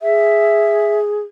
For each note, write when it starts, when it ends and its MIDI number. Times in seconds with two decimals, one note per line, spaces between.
0.01 1.21 68
0.01 0.99 76